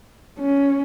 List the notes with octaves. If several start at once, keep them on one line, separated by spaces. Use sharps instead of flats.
C#4